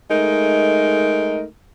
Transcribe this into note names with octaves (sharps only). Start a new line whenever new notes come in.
G#3 A3 D#4 A#4